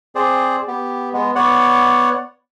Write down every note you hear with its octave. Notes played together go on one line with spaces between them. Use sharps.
C4 G#4 C5 D5
B3 G4
G#3 B3
B3 C#5 D5 F#5